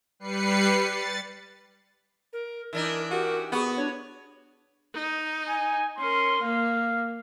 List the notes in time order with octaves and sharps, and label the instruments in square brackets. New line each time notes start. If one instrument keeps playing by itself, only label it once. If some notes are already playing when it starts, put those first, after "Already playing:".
[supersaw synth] G3 B4 C7 C#7
A6
[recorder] A#4
[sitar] E3 D4 D#4 [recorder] A#4
[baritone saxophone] F#4 [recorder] G4 [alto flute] A#4
[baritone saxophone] B3 [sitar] F#4 [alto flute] G#4
[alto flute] D4 [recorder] C#5
[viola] D#4
[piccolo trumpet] G#5
[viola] C#4 A#4 [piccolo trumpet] C6
[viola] A#3 [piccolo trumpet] F5